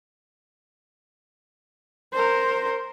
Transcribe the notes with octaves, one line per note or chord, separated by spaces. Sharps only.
A#4 C5